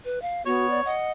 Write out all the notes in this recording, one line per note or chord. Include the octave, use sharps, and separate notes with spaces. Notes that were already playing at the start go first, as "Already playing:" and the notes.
B4
F5
B3 F#4 C#5
D5
D#5 F#5